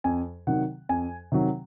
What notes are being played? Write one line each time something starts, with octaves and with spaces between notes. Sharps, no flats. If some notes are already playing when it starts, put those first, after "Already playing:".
F2 G#5
C3 D#3 F#3 F#5
F2 G#5
C3 D#3 F#3